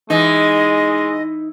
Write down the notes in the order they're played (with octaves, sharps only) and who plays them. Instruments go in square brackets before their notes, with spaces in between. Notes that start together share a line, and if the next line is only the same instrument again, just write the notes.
[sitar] E3 [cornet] G#3 [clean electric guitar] D#4 [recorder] D#5